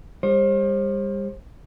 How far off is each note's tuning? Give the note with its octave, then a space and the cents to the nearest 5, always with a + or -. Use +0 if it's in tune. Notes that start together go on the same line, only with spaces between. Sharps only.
G3 +35 C5 +40